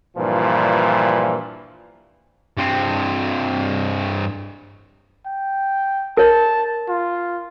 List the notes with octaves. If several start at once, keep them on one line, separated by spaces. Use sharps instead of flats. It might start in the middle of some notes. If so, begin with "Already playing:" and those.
G2 A#2 E3 F3
G2 C4
G5
A#4 C#5 A5
F4